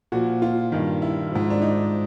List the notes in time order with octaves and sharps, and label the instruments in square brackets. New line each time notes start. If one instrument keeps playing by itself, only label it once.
[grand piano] A#2 F3 F#4
F4
G2 D#3
E4
G#2 F3
D4
D#4